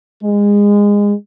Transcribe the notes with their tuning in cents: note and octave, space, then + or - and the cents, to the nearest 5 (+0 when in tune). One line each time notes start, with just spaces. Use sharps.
G#3 -25